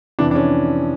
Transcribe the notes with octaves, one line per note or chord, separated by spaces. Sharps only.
F2 C3 E3 D4
D4
C#4